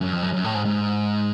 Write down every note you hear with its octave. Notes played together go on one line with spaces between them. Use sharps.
F#2
F2
F#2
F#2
A2
G#2
G#2